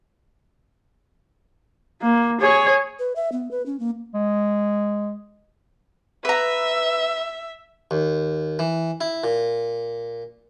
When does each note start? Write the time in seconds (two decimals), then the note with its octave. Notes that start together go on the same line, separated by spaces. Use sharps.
2.01 A#3
2.41 G#4 C#5
2.99 B4
3.16 E5
3.32 B3
3.51 B4
3.66 C#4
3.80 A#3
4.14 G#3
6.25 B4 E5 A#5
7.91 D#2
8.59 E3
9.01 E4
9.24 A#2